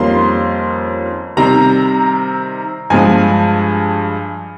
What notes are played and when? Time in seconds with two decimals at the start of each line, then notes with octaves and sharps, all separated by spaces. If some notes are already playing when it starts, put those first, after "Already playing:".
Already playing: F2 D#3 G3 A#3 C#4 C6
1.37 C3 D#3 G3 C4 A#5
2.90 G2 F3 G#3 G#5